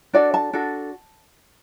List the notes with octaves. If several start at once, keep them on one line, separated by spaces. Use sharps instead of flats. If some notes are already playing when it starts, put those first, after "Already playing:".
D4 F#4 A4 D5
A5
D4 F#4 A4